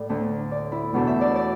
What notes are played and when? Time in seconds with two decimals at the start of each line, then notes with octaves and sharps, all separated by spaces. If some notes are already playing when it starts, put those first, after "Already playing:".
Already playing: A2 D5
0.09 D2 D3 A3 D4
0.52 D5
0.72 E4
0.94 E2 B2 A3 D4
1.07 E5
1.21 D5
1.36 D5